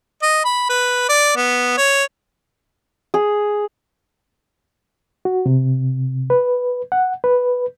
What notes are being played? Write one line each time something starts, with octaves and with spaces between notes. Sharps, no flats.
D#5
B5
B4
D5
B3
C#5
G#4
F#4
C3
B4
F#5
B4